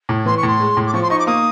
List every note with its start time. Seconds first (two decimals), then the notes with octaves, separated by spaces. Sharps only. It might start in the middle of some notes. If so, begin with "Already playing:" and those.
0.09 A2
0.26 E3 C6
0.37 C#6
0.43 A2 C6
0.60 G#3
0.77 A2
0.87 D6
0.94 F3 C#6
1.02 C6
1.10 D#4 C#6
1.19 D6
1.27 A#3 D#6